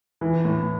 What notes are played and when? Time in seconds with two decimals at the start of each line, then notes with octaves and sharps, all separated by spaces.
0.21 E3
0.45 A2